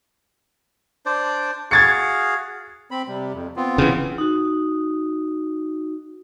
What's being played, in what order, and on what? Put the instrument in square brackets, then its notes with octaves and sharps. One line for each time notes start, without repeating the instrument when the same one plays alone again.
[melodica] D4 C5 D5
[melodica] F#4 G#4 F5 [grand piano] G#6 A6 C#7
[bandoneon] C4 B5
C3 G3
F2
B3 C4 F4
[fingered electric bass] C#3 E3
[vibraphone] D#4 F#4